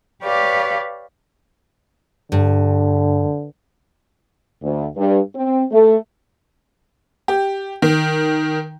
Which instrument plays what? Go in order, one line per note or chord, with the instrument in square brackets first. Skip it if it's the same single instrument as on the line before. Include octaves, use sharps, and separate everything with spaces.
[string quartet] G4 B4 C#5 D5 F5
[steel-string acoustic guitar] G2 [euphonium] D3
[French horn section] D2
G2
C4
A3
[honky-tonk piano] G4
D#3